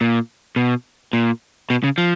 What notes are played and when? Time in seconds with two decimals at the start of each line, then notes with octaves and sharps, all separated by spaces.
0.01 A#2
0.56 B2
1.13 A#2
1.70 B2
1.84 C#3
1.98 F3